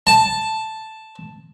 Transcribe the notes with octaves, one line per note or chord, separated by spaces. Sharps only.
A5